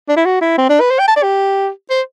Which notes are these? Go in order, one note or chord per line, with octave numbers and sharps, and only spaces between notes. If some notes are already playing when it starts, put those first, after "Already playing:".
D4
E4
F#4
E4
C4
D4
B4
C5
G5
A5
D5
G4
C5